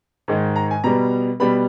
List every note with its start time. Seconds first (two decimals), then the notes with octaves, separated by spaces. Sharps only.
0.28 G#2 D#3 G#3
0.56 A#5
0.71 G#5
0.84 B2 G3 B3 A#5
1.40 B2 G3 B3 B5